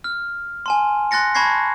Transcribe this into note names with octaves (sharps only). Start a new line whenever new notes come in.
F6
G#5 A5 C6
C6 F#6 A6 A#6 C#7
A5 B5 C#6 G#6 A#6 C7